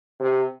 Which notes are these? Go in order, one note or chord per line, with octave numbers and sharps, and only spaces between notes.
C3